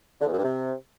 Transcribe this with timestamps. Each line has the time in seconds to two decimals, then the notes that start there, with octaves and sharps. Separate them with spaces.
0.21 D3
0.26 E2
0.32 F#2
0.38 G2
0.43 C3